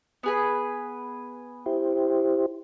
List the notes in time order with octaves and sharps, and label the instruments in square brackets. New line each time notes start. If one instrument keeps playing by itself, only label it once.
[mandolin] B3 G#4 B4
[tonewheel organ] E4 G4 C5